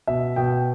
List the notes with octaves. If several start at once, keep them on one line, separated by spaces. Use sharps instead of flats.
B2 E5
B2 G5